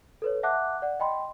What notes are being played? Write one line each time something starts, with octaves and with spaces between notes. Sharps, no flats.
A4 B4 C#5
E5 F#5 A5 D6 F#6
D5 F#5
D#5 G5 B5 C6